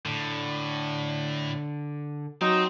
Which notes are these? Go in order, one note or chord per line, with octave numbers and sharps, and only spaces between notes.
A2 D3
F#3 C4 D#4